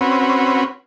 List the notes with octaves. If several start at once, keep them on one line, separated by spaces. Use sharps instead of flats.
C4 C#4 F#4 B4